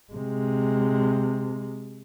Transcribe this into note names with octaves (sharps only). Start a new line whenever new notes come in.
C3 G#3